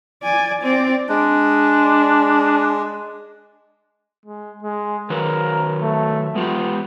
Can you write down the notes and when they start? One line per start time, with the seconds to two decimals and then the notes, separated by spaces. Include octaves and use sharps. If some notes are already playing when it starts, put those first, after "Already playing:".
0.23 D5 G#5
0.62 C4 D5
1.09 G#3 D4
4.26 G#3
4.63 G#3
5.10 D#3 F#3 A#4 B4
5.82 A3
6.35 G#3 B3 F4 G4